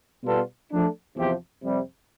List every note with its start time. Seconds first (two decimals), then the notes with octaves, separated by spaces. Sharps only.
0.24 B2 G3 B3 F4 A4
0.71 F3 A3 D4
1.17 E2 C3 F3 C4 G4
1.63 F2 C3 G3